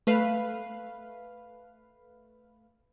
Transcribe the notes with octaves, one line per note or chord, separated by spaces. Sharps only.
A3 B4 F5